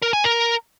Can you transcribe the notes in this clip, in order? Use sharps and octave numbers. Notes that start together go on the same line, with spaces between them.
A#4
G#5
A#4